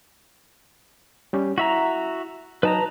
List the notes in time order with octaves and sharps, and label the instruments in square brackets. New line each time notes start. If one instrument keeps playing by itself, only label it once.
[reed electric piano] G3 C#4 G4
[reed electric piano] E4 [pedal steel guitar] F#4 E5 A#5
[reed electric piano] F#3 D#4 [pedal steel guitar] B4 A5 A#5